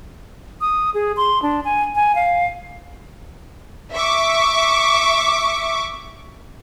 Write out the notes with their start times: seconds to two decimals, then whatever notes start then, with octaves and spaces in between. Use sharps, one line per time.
0.61 D#6
0.94 G#4
1.17 C6
1.42 D4
1.65 G#5
1.95 G#5
2.15 F5
3.93 E5 C#6 D6